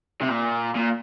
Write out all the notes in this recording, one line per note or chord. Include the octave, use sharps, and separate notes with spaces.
C3
A#2
A#2